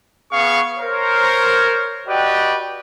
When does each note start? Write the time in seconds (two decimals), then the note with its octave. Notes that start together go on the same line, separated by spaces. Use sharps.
0.32 B3 G#4 F5 C#6
0.77 A#4 C5 C#5
2.07 F#4 G4 B4 D5 D#5 G5